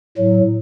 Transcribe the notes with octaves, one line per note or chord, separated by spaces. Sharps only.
A2 F#3